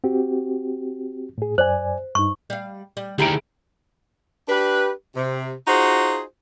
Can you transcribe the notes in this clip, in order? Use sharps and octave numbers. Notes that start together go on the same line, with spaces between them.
C4 F#4 G4
A2 G#4
F#2 C5 D5 G#5
G2 D#4 C#6
G3 F5
G3
D2 D#3 D#4 E4 G4 G#4 A#5 D7
D4 G4 B4
C3
D#4 F4 F#4 G#4 C5